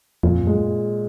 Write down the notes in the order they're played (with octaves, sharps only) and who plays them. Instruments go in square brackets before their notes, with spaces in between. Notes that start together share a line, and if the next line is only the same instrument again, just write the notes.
[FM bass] F2 [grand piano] A#2
[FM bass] F#2
[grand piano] G#3